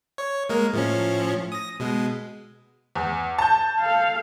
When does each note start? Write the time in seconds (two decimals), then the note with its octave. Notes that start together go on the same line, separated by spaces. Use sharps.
0.18 C#5
0.49 G#3 A#3 A#4
0.73 A2 F3 C#4
1.52 D#6 A#6
1.80 B2 G#3
2.95 E2
3.38 A5 G6
3.80 A4 F5